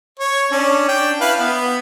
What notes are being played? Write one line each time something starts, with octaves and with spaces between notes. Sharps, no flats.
C#5
C#4 D4
D4 G5
E4 B4 F5
B3